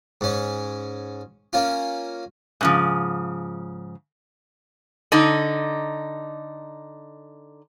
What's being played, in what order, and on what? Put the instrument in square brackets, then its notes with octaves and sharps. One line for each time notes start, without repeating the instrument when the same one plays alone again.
[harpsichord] G#2 C#4
A#3 C#4 F4
[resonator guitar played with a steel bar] G#2 C#3 F3
D3 D#4